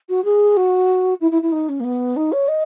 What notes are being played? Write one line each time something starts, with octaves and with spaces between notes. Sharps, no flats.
F#4
G#4
F#4
E4
E4
E4
D#4
C#4
A#3
B3
D#4
C#5
D#5